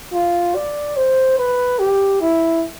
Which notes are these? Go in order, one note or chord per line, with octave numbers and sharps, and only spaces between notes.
F4
D5
C5
B4
G4
E4